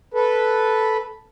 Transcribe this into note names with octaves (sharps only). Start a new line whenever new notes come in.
A4 B4